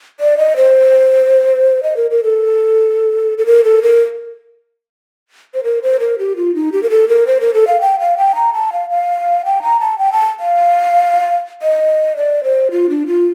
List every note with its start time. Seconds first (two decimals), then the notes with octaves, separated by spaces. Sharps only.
0.20 D5
0.38 D#5
0.56 C5
1.83 D#5
1.96 A#4
2.11 A#4
2.23 A4
3.38 A4
3.46 A#4
3.64 A4
3.83 A#4
5.54 C5
5.64 A#4
5.82 C5
6.00 A#4
6.19 G4
6.36 F4
6.55 D#4
6.72 G4
6.83 A#4
6.90 A4
7.09 A#4
7.27 C5
7.41 A#4
7.54 A4
7.67 F5
7.81 G5
8.00 F5
8.18 G5
8.35 A#5
8.54 A5
8.73 F5
8.90 F5
9.45 G5
9.63 A#5
9.80 A5
9.98 G5
10.12 A5
10.40 F5
11.62 D#5
12.17 D5
12.44 C5
12.71 F4
12.89 D4
13.07 F4